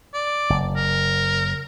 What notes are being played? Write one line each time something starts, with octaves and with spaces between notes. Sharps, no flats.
D5
F#1
A#4